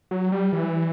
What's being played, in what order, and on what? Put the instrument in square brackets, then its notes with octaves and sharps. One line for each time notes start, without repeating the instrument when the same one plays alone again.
[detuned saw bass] F#3
G3
E3